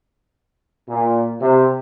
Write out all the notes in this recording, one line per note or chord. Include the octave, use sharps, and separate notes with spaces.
A#2
C3